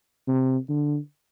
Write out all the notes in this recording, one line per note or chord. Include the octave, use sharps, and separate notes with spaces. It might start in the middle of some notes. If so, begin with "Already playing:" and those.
C3
D3